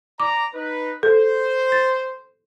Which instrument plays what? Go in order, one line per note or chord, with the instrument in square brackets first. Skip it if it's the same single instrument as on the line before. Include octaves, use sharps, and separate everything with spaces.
[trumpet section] D5 A#5 [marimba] D6
[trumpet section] D#4 B4
[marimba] A4 [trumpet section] C5
[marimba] A6